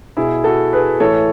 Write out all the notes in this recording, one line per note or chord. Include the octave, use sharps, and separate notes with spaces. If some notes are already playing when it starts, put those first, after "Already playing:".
B2 E4 G#4
F#4 A4
G#4 B4
A2 E3 A4 C#5